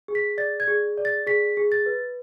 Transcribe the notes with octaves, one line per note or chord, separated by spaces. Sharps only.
G#4
B6
D5 A6
G#6
G#4
D5
A6
G#4 B6
G#4
A6
B4